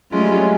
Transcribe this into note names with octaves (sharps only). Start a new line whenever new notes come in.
F#3 G#3 A3 C#4 F4
G3
G#3